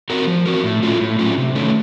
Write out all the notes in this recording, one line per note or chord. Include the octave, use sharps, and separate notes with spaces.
C4 F#4 A#4
F3
C4 F#4 A#4
A2
F#3 A3 C#4 F4
A2
F#3 A3 C#4 F4
C3
D#3 A3 C#4